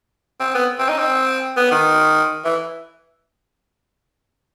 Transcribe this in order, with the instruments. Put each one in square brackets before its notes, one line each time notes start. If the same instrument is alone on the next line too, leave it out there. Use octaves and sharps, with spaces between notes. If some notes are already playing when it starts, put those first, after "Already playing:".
[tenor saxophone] C4
B3
C4
D#4
C4
B3
D#3
E3